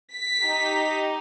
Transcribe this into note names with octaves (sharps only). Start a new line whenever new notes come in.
B6
D#4 G4